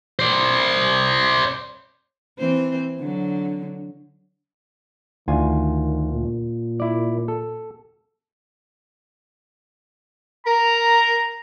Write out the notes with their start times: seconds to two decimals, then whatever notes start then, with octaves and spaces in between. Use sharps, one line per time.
0.19 C5 D5
2.38 E3 C4 C5
2.99 D3 F#3
5.28 D2 D#3 F4 G#5
6.12 A#2
6.80 E4 D5
7.28 A4
10.47 A#4 A#5